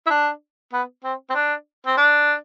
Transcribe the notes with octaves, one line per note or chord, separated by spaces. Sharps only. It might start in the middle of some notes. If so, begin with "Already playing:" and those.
E4
D4
B3
C4
C4
D4
C4
D4